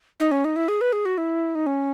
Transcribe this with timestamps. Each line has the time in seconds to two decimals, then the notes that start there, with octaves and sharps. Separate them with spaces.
0.20 D#4
0.31 C#4
0.45 D#4
0.56 E4
0.68 G#4
0.81 B4
0.93 G#4
1.05 F#4
1.18 E4
1.55 D#4
1.66 C#4